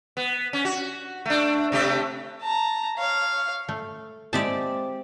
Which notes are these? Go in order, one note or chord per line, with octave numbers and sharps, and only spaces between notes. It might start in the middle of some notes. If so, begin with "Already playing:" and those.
B3
C#4
F#4
A3 D4
C3 A3 G4
A5 A#5
C#5 F5
A3
G#3 C4 G4 D5 E5 A5